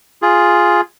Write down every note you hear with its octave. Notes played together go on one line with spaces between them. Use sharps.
F4 G#4